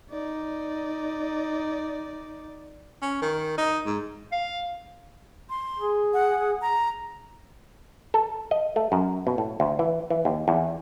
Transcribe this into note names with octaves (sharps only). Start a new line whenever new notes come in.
D#4 D5
C#4
D#3
D#4
G#2
F5
C6
G#4
F#5
A#5
A4
D#5
A3
F#2
B2
A2
D2
E3
E3
D#2
E2